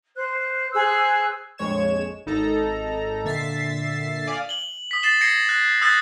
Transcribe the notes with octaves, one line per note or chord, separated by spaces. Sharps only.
C5 F#6
G#4 C5 E6 F#6
A#1 F2 G#3 C#5 G#6 E7
G#1 D#4 A4 A#5
A#2 D3 E5 A6 B6 C7
D5 F5 G#5 D6 D#6
F#7 G7
D#6 B6
A6 C7 E7 G7
G#6 A#6 C7 C#7
F#6
D#6 E6 F#6 G6 A6 C7